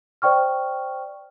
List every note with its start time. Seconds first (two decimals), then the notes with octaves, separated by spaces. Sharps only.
0.22 C5 D5 G5 C#6 F6